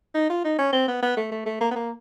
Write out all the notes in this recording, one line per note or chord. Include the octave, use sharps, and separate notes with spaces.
D#4
F4
D#4
C#4
C4
B3
B3
A3
A3
A3
A#3
B3
A#3